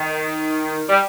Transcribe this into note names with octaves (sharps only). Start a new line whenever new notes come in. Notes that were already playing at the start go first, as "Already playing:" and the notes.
Already playing: D#3
G3